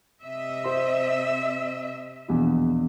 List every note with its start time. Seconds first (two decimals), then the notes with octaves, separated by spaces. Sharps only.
0.22 C3 D#5 E5
0.64 C5 C6
2.28 A#1 E2 B2